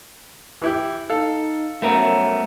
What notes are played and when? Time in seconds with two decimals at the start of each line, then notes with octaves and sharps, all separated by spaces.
0.62 E3 E4 G4
1.10 D#4 A4 F5
1.82 F#2 A3 B3 A#4